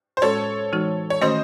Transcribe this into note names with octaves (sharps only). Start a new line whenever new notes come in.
C5
A2 G#3 C#4 F#4 A4 C#5
E3 G#3 D#4 F#4
C#5
D#3 A3 C#4 F#4 C5 D#5